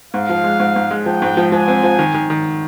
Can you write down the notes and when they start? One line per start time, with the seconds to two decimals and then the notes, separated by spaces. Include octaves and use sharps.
0.13 G#2 F5
0.29 F3
0.44 G#3
0.60 G#2
0.76 G#2
0.91 G#3
1.06 F3 G5
1.22 G#2
1.37 F3
1.52 F3 G#5
1.68 C4
1.83 F3
1.99 D#3
2.14 D#3
2.30 D#3